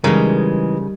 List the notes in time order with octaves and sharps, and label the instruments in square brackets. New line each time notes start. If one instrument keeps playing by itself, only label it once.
[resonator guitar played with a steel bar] C#3 [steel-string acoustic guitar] E3 G#3 [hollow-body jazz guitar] G3 D#4 A#4